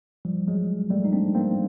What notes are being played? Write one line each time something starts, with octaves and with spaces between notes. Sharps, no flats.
F3 G3
F#3 G#3
G3 A3
D#4
C4 D4
A#3 C4